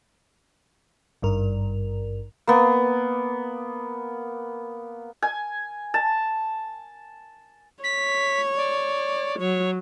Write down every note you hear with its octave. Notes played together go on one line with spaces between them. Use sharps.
G#1 G2 A#4
A#3 B3
G#5
A5
C#5 B6
D5
F#3 C#5